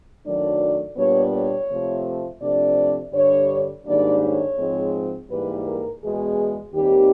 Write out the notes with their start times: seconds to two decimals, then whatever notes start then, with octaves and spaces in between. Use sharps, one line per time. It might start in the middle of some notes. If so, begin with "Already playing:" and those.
0.25 F#2 D#3 F#3 A3 D4 D5
0.97 A#2 G3 B3 D4 C#5
1.33 C#5
1.69 C3 F3 A3
2.41 C3 F3 A3 D4 D5
3.13 G2 D3 G3 C#5
3.85 G#2 D#3 G3 A#3 D4 D5
4.21 C#5
4.57 G#2 F3 G#3 C4
5.29 G#2 E3 G3 A#3 B4
5.65 A#4
6.01 E2 B2 G#3 G#4
6.73 D#2 D#3 G3 C4 G4